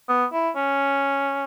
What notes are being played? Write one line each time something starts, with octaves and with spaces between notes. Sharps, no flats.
B3
E4
C#4